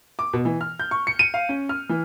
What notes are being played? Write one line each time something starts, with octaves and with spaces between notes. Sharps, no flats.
D6
B2
E3
F6
G6
C#6
C#7
D#7
F5
C#4
F6
E3